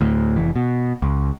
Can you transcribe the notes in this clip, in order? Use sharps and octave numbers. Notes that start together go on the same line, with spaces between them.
D2 A2
F1 E3
B2
C#2